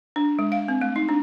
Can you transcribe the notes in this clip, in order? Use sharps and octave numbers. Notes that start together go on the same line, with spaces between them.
D4
G#3
F5
C4
A3
D#4
D4